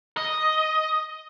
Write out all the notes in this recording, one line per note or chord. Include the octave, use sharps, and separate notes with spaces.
D#5